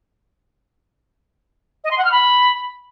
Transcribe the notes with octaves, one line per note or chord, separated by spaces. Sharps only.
D#5
C6
F#5
F6
B5